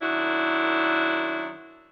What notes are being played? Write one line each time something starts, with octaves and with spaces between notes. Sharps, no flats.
F#2 D#3 D4 E4 F#4